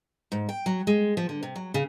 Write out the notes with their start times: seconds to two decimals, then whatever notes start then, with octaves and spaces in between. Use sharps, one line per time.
0.32 G#2
0.49 G5
0.66 F#3
0.87 G#3
1.17 F3
1.29 D3
1.43 C3
1.56 F#3
1.74 C#3